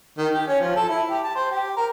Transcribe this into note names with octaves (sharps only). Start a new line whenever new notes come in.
D#3
G4
C#4
F3
A4
E4
G4
A5
C5
G4
A#4